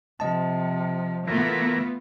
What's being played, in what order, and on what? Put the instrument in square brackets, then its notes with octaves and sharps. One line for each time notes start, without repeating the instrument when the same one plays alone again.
[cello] C3 F3 [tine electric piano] D#5 A5
[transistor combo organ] E3 A#4 [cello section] A3 B3 [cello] F4